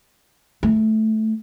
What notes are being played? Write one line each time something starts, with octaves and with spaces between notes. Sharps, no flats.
A3